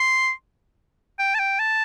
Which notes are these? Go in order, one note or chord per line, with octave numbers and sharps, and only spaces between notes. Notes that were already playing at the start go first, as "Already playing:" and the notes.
Already playing: C6
G5
A5
G5
A5